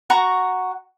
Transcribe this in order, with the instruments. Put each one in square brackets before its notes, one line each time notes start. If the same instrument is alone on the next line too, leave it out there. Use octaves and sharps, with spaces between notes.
[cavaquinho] F#4 F#5 A#5 C#6